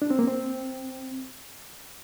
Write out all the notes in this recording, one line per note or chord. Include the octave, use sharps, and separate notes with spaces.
D4
C4
A#3
C4